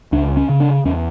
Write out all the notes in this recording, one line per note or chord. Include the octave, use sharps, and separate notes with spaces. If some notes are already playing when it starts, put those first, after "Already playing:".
C#2 D4
C#4
C#3
D4
E2 C#4